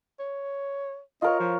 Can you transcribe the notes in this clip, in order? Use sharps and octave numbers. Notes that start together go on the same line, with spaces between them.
C#5
F4 A#4 C#5 D#5
F3